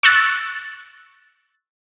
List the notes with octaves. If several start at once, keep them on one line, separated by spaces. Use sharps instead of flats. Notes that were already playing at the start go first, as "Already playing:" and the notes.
C#6 E6 F#6 A6